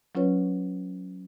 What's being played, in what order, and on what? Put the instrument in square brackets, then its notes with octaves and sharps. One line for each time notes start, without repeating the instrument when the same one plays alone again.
[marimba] F#3 C#4 F4 B4 C#5